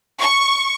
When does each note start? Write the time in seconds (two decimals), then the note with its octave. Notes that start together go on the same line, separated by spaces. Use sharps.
0.19 C#6